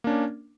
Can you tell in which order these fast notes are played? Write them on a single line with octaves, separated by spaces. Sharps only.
A#3 D4 C#4